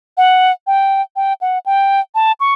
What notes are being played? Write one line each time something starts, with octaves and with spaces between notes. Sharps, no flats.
F#5
G5
G5
F#5
G5
A5
C#6